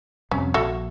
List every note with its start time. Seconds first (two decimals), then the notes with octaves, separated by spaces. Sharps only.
0.31 F2 C3 G3 C#4
0.54 A#1 F#4 A4 E5